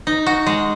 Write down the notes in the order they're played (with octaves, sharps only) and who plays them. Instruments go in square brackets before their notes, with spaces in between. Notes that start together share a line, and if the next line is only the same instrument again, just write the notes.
[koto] D#4
F#4
G#3